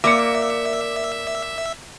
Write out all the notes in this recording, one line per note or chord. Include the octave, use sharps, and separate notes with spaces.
A#3 A#4 D5 E5 A#5 D6 C#7